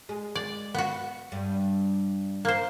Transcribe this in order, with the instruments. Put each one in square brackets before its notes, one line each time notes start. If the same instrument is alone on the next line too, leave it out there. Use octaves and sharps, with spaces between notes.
[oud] G#3
[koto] D5
B3 F#4
[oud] G2
[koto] A#3 C5